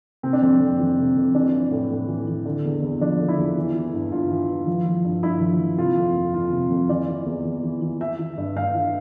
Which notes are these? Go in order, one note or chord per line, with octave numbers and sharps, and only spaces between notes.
C3 C4
D4
F2 C4
F2
E3
C3
F2
E3 D4
E3
A2
A2
E3
E3
D3
E2
E2
F3 D4
D3
E4
E2
E3
E3
G2
G2 F4
E3
E3
F3
F3
G2
G2 E4
F3
F3
C3 F4
F2
F2
E3 F4
C3
F2
E3 D5
E3
E2
E2
E3
E3
E3 E5
E3
G2
G2 F5
E3